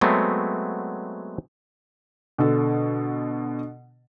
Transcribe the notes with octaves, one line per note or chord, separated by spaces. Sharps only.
F#3 G#3 A3 B3 C4
B2 D3 A4